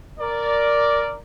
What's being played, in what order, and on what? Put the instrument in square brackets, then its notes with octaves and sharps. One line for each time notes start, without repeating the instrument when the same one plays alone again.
[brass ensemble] A#4 D5